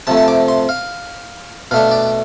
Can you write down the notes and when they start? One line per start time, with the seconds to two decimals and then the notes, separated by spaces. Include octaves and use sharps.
0.07 C3 F3 A3 A5
0.17 A5
0.28 D6
0.48 C6
0.69 F5
1.71 B2 A3 D4 F5
1.91 D5